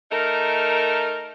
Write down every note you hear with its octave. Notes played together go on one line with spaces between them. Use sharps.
A3 D#4 A#4